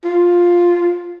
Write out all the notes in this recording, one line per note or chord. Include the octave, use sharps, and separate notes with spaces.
F4